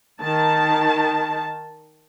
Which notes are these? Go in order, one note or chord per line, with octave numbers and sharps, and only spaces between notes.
D#3 A5